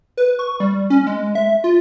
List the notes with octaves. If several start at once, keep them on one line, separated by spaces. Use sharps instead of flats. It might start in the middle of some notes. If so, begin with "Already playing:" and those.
B4
C#6
G3
C#4
G#3
E5
F4